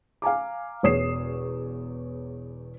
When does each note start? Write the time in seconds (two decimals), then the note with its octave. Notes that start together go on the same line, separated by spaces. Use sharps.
0.22 F5 G#5 A#5 D6
0.83 E1 E2 C#5 D#6 C7 E7